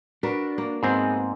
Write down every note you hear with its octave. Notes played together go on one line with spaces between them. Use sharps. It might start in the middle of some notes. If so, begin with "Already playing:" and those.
D4 F#4 A#4 B4
A#3
G#2 B3 C4 G#4